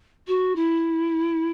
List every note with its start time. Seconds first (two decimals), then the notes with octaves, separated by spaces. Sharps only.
0.27 F#4
0.55 E4